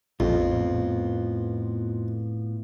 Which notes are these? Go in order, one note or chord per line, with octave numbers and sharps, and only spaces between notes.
A#1 F2 A2 B3 F4